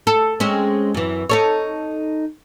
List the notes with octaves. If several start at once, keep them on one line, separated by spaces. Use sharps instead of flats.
A4
G#3 C4 C#4
F#2 E3
D#4 A4 C#5